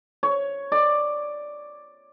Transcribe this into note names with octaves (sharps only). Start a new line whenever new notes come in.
C#5
D5